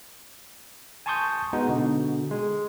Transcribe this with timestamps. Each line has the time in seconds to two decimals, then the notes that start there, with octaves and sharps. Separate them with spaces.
1.06 G#5 A5 C6 C#6 D#6 G6
1.53 G#3 B3 D#4 F#4
1.68 B2 D3
2.31 G#3